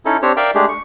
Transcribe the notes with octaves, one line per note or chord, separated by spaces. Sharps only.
C#4 D#4 E4 A4
C4 D4 G4 C5 C#5
A#4 D5 E5 F5 G5
G#3 A3 D4 G4 G#4
C#6